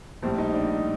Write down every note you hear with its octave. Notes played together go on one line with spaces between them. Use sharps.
A#1 A2 G3 C5
D#4
D4
D#4